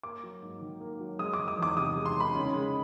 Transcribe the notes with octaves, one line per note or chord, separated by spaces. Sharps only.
A#3 D6
F#3
G#2
D#3
A#3
F#3
G#3 D#6
D#3 D6
D#6
E2 D6
C3 D#6
G#3
C6
D#3 B5
C#3
G#3